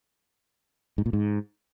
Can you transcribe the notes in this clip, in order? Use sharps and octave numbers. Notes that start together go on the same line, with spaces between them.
G#2
A#2
G#2